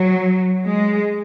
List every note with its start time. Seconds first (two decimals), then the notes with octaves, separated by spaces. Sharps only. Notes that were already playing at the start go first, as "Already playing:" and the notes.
Already playing: F#3
0.65 G#3